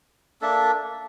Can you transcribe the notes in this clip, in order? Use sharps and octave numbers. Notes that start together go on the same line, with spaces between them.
A#3 D4 A4 E5